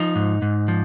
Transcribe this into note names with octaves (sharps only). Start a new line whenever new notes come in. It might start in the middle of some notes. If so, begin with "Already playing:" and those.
Already playing: F3 D#4
G#2
G#2
F3